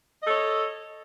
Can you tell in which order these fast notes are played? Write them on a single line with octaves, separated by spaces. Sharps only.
D#5 A4 C#5